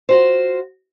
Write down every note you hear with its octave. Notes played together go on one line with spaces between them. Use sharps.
F4 F#4 C5